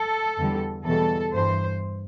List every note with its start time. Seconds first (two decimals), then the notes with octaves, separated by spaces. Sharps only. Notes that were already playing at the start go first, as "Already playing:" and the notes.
Already playing: A4
0.37 E2 D3 G3
0.84 E2 B2 G3 A4
1.32 G2 E3 C5